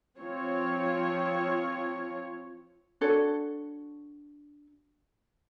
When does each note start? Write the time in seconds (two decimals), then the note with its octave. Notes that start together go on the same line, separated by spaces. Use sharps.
0.19 F3 C4 F4 C#5
3.01 D4 F#4 A4 C#5